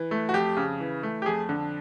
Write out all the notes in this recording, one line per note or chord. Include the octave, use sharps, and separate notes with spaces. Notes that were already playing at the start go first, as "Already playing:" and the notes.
Already playing: E3
A3
F#4
F2 G4
C#3
E3
A3
G4
F2 G#4
D3